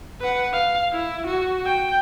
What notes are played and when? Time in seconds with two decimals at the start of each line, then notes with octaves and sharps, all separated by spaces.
0.20 B4 F#5
0.53 F5
0.92 E4
1.27 F#4
1.66 G5